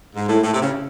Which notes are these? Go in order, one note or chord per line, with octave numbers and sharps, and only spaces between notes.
G#2
A2
A2
C3
C#3